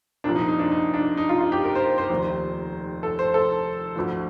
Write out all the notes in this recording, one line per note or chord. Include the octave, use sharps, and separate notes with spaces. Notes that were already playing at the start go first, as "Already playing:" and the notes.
C2 A#2 F3 D4
D#4
D#4
D4
D#4
D4
D#4
F4
F4
G4
A#4
C5
C5
F1 D#2 D#3
A4
C5
A4
D2 D3 F3